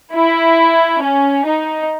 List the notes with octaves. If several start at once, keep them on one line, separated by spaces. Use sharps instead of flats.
E4
C#4
D#4